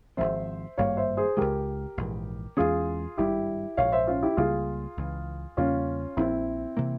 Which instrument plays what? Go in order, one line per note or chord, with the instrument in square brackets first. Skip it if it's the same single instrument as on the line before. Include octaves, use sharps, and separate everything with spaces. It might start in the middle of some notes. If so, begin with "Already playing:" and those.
[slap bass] G#1 G#2 F3 C4 [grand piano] C5 E5
[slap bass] G#1 G2 G3 A#3 [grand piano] C#5 F5
[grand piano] C5 E5
G#4 C5
[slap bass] C#2 C#3 E3 G#3 [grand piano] G4 A#4
[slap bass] A#1 G#2 E3
[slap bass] E2 E3 G#3 C#4 [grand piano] F4 G#4
[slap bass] G#1 G2 G3 [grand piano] E4 G4
[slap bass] A#1 G#2 F3 [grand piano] C#5 F5
[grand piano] C5 E5
C#4 F4
E4 G4
[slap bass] C#2 C#3 G3 A#3 [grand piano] F4 G#4
[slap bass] C#2 C#3 E3
[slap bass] E2 C#3 G3 A#3 [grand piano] C#4 F4
[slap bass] A#1 A#2 F3 [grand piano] C4 E4
[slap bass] C3 E3 A#3